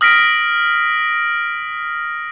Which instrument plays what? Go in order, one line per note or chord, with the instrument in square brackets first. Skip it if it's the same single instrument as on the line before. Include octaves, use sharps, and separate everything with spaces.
[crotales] D#6 F6 A#6 B6 D7